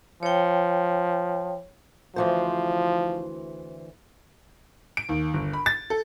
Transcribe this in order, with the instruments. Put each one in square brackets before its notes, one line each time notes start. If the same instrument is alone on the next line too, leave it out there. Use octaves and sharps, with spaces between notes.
[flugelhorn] F3 [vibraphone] C#5 G5
[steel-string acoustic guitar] D2 E3 C5 [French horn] F3
[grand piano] D7
D#2
G1
B5
A6
A4